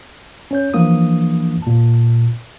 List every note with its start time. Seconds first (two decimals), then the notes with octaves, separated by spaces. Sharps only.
0.51 C#4 C#5 G6
0.74 E3 F3 A#3 D4 D#6
1.62 A#2 A5